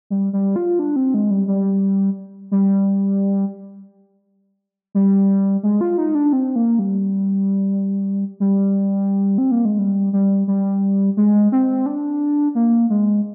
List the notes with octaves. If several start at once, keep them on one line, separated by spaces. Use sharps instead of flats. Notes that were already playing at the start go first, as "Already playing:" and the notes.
G3
G3
F4
D4
C4
G#3
G3
G3
G3
G3
G#3
F4
D#4
D4
C4
A#3
G3
G3
C4
A#3
G#3
G3
G3
G3
G#3
C4
D4
A#3
G#3